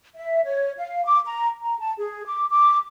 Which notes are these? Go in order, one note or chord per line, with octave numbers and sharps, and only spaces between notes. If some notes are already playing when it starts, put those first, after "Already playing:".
E5
C#5
F5
D6
A#5
A#5
A5
G#4
D6
D6